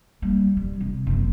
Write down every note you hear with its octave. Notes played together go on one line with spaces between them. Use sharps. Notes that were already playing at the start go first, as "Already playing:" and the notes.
G3 A#3
F2 G3
C3
F#1 F3